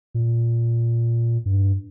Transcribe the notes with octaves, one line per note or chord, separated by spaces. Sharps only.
A#2
G2